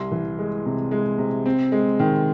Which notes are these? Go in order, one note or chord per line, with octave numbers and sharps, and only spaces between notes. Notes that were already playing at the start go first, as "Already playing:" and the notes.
Already playing: C2 C6
E3
G#3
C3
G#3
C3
C4
G#3
D#3